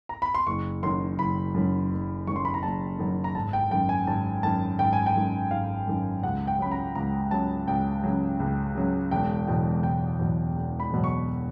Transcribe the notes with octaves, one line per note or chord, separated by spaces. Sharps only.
A#5
B5
C6
F#1 C#6
F#2 D#3 F#3 C6
F#1 B5
F#2 D#3 F#3
F#1
F#2 D#3 F#3 C#6
C6
B5
A#5
F#1 A5
F#2 D#3 F#3
A#5
G#1 A5
G5
F#2 D#3 G5
G#5
G#1 A5
F#2 D#3 A5
G#1 G5
G#5
G5
F#2 D#3
G#1 F5
F#2 D#3
C#2 F#5
G5
C#3 F#3 B5
A#5
C#2 A#5
C#3 F#3 A5
C#2 G5
C#3 F#3
C#2
C#3 F#3
E1 G5
E2 B2 F#3 G5
E1 G5
E2 B2 F#3
E1
B5
E2 B2 F#3
C#6